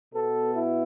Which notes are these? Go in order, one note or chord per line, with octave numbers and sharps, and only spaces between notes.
B2 B3 A4
E4